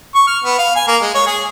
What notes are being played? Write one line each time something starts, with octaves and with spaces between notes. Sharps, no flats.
C#6
F6
B3
F5
G#5
A#3
G#3
C#5
G#4